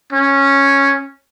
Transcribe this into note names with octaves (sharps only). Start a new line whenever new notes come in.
C#4